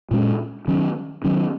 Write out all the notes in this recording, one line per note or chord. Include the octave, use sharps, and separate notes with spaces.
A#2 G#3 C#4
D#3 F#3 C#4
D#3 F#3 C#4